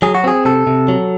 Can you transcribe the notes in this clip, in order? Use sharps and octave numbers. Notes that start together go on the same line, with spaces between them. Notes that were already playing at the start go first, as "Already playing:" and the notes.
F#3 G#4
F#4
C4 G#4
C3 A4
C3
F#3